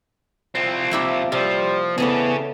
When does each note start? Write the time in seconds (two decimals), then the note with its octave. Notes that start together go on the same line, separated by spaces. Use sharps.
0.55 C2 F3 C4 G5
0.91 A#3 E4 G4
1.32 C3 F3 G3
1.98 C#3 E3 A3 B3 C#4 G#4 D5